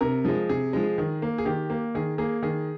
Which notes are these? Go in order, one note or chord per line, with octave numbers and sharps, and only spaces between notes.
C3 A#4
F3 G#3
C3 G#4
F3 G#3
D#3
A#3
G#4
D#3 G4
A#3
D#3 G#4
A#3 G#4
D#3 G#4